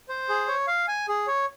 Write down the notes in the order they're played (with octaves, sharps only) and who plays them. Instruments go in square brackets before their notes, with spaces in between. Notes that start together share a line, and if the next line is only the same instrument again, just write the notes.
[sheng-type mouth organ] C5
G#4
C#5
F5
G#5
G#4
C#5